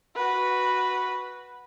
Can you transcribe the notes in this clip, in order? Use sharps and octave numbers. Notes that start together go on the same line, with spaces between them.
F#4 B4